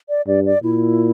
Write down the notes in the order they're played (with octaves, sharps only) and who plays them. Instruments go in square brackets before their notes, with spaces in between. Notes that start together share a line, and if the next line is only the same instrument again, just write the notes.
[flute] D5
[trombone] G2 [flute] D5
[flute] D5
[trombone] A#2 [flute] E4